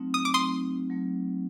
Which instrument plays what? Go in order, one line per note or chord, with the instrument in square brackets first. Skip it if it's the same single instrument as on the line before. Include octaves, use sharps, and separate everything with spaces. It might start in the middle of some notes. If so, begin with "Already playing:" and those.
Already playing: [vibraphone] F#3 A3 C4 D#4
[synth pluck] D#6
D6
C6 D#6
[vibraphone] F#3 A3 C4 D#4
F#3 A3